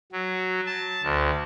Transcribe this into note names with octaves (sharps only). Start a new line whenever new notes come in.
F#3
A5
D2